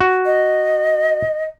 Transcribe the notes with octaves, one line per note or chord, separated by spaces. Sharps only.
F#4
D#5